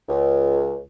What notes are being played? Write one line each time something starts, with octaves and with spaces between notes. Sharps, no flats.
C#2